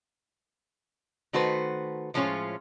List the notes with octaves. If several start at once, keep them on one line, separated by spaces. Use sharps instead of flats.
D#3 A3 F#4 B4 C5
A2 F3 G#3 C#4 F4 C#5